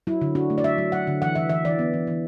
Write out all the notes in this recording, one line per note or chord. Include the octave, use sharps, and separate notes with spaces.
F#3 E4
D3
D4 F#4
A3
D5
F#3 E5
F#3
F#3 F#5
D3
E3 F#5
E3 E5
E3 E5
E3 D5
B3
E3
E3